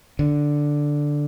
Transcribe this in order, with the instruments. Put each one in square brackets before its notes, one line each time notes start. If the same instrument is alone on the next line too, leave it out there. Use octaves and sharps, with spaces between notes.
[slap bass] D3